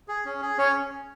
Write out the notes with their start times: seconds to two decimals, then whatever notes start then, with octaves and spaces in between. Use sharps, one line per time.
0.08 G#4
0.25 C#4
0.42 G#4
0.58 C#4 C#5